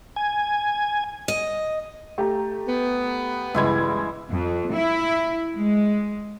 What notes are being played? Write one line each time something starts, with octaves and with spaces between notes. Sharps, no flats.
G#5
D#5
A3 G4 A#5
B3
C#2 G2 E3 G#3 E4 G#6
F2
E4
G#3